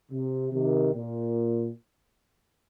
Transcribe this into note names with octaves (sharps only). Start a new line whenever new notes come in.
C3
C3 D#3
A#2